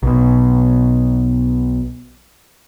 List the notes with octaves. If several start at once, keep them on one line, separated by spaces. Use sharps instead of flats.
B1 B2